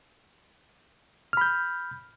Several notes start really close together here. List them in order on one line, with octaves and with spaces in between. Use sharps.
F6 B5 G6